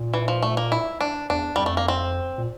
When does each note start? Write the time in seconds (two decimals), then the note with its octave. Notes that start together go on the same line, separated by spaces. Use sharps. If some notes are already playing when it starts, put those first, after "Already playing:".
Already playing: A#2
0.14 E3
0.28 F3
0.42 A3
0.57 A#3
0.72 E4
1.01 D4
1.30 E2 D4
1.56 F2 G3
1.66 A3
1.77 A#3
1.88 C4
2.38 A#2